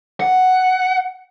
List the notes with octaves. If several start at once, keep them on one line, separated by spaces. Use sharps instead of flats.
F#5